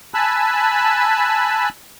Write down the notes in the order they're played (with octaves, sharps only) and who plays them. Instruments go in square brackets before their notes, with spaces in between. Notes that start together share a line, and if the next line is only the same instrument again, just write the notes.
[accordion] G#5 A5 B5 E6 F#6